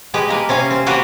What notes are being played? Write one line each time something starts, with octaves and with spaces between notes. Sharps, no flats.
G#3 G4 B4
A#3 A#4 B4
C3 C#4 F5 G#5
C4
A#3 F#4 G4 A#4 B4